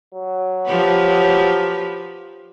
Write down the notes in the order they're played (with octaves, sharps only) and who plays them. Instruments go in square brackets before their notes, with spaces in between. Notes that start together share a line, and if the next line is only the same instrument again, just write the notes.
[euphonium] F#3
[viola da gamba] F3 G4 B4